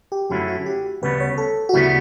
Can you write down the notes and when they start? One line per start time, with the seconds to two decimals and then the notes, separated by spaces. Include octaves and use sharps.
0.12 G4
0.30 F#2 D3 A3 C#4 E4 F#4
0.48 F#4
0.66 G4
1.02 D2 C#3 G3 B3 B4
1.20 C#5
1.38 A4
1.69 F#4
1.73 D2 C#3 G3 B3 E4